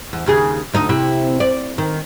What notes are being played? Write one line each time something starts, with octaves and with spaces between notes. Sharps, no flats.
E2
D#2 C#3 G#4
D2 D#4 D#5
C3 E4 G4
D5
D#3